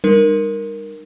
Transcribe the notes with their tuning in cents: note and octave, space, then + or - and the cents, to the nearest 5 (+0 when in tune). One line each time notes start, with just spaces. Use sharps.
G3 +25 D#4 -30 A#4 +0